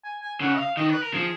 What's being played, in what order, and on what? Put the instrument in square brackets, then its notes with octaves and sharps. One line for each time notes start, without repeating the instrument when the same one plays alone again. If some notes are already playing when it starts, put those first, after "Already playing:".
[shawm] G#5
G#5
[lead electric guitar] C#3 [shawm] F#5
[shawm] D#5
F5
[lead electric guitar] D#3 [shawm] D#5
[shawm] B4
A#4
[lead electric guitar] F3 [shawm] G#4